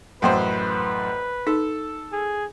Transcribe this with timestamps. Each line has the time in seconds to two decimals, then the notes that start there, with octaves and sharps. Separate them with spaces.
0.22 A1 F#2 B4 C5 F#5 G5
1.47 D#4 A4
2.12 G#4